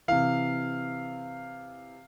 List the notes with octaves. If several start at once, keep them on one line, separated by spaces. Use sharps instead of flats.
C3 E3 F5